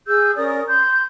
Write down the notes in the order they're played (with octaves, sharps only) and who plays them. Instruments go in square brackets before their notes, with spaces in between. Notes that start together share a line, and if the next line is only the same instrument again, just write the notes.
[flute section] G#4 E6 G6
C#4 A#4 D5 D#6
C6 G6